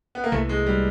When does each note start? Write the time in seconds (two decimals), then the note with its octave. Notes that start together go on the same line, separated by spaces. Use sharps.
0.15 B3
0.24 A#3
0.32 C2 C3 E3 A3
0.49 G#3
0.66 G3